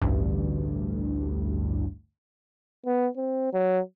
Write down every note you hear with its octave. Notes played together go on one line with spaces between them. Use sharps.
A1 D2 G2
B3
C4
F#3